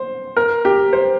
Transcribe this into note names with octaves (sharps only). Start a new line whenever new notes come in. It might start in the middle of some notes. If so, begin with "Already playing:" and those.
Already playing: C5
A#4
G4
C5